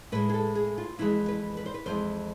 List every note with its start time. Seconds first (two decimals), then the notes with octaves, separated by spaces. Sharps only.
0.12 A2 G#3 B4
0.29 G#4
0.34 A4
0.55 G#4
0.78 F4
0.99 F2 E3 G#3 E4
1.29 B4
1.57 B4
1.66 C5
1.74 B4
1.86 F2 E3 G#3 C5